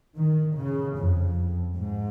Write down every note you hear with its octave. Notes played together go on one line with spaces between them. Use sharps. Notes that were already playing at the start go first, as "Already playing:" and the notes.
D#3
C#3
F2
G#2